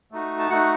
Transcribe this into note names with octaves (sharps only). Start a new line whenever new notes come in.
A3 D#4 F#4
A5
A3 D#4 F#4 F#5